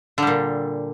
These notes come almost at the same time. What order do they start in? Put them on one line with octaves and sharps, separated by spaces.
D3 G3 A#2